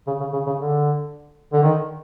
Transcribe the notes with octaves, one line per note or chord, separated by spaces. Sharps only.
C#3
C#3
C#3
C#3
D3
D3
D#3